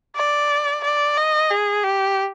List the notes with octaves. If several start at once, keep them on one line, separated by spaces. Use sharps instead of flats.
D5
D5
D#5
G#4
G4